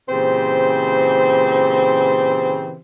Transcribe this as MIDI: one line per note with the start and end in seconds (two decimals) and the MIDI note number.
0.09 2.76 46
0.09 2.76 49
0.09 2.76 52
0.09 2.76 60
0.09 2.76 67
0.09 2.76 72